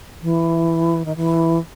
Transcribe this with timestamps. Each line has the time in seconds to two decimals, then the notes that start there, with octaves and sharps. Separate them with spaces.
0.22 E3
1.05 D#3
1.17 E3